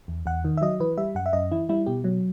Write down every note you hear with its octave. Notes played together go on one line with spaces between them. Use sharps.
E2
E2 F#5
D#3
E5
F#3 D#5
E3 B4
G3 E5
F#2 F#5
E5
F#2 D#5
E3 E4
G3 E4
B2 G4
F#3